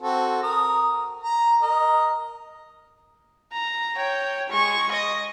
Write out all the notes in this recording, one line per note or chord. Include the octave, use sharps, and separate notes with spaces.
C4 F#4 A4
A#4 D#6
A#5
A#4 D#5
A#5
C#5 G5
G#3 C#6
D#5